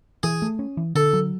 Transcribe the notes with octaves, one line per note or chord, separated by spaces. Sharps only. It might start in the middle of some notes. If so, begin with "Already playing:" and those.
E3 G#4
A3
C#4
E3
D3 A4
F#3